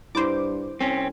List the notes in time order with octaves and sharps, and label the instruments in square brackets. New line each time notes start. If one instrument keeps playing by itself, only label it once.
[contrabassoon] G2 [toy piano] E4 B5 [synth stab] C5 D6
[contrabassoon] C2 [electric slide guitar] C4 C#4